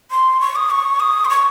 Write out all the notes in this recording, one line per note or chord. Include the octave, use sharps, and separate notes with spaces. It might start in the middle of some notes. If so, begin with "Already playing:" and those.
C6
C#6
D#6
C#6
D#6
C6
C#6